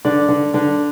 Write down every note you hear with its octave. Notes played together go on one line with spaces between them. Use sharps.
D3 D5
D3
D3